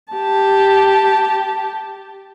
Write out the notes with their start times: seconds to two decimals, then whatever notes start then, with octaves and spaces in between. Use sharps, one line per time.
0.13 G4 A5